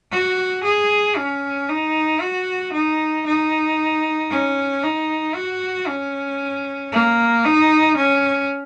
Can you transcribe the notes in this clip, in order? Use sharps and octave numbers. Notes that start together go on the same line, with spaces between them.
F#4
G#4
C#4
D#4
F#4
D#4
D#4
C#4
D#4
F#4
C#4
A#3
D#4
C#4